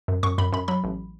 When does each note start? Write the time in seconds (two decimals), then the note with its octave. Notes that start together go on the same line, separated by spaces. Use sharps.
0.08 F#2
0.23 F#2 C#6
0.38 F#2 B5
0.53 F#2 B5
0.68 F#3 B5
0.84 A1